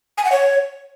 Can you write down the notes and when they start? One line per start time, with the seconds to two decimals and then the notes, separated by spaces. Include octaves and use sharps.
0.18 G#5
0.25 F#5
0.32 C#5